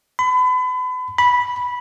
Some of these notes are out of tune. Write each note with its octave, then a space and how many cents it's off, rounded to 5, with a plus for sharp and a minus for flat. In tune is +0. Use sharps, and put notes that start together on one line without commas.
B5 +35
B5 -10